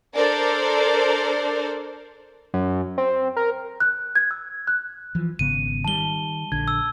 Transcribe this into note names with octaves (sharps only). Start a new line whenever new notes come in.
D4 A4 A#4 C5 D5
F#2
C4
A#4
F#6
G#6
E6
F#6
E3 F3
G#1 C#3 B3 D#7
D#3 G3 A5 G7
A#1 D3 G#6
E6